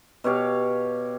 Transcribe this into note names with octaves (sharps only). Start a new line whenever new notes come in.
B2 G4 C#5 F5